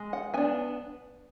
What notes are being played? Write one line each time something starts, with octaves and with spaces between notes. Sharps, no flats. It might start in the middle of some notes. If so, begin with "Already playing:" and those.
Already playing: G#3
F#5
B3 D4 G#5